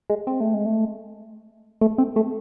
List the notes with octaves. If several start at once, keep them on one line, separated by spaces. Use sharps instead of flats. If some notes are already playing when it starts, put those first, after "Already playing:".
G#3
C4
A3
G#3
A3
A3
C4
A3